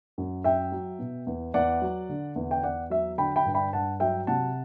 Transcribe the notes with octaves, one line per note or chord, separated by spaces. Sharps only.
F#2
F#2 E5 G5
F#3
B2
E2
E2 D5 F#5
F#3
D3
E2
G5
E2 D5 F#5
F#3 E5
D3 G5 B5
G5 B5
G2
G5 B5
G2 F#5 A5
F#3 E5 G5
C3 F#5 A5